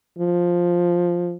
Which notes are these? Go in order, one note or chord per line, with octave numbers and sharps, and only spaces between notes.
F3